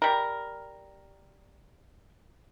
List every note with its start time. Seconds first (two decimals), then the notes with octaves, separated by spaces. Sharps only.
0.02 G3 A#4